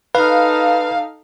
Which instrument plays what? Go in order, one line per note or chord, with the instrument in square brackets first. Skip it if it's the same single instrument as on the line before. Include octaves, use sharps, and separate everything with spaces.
[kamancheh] D#4 A4 [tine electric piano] B4 [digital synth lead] F5